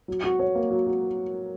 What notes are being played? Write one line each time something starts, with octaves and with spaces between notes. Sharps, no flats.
F#3
F#4
C#5
A#3
F#3
F#4